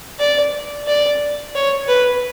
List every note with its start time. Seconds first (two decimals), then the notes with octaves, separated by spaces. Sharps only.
0.19 D5
0.87 D5
1.55 C#5
1.88 B4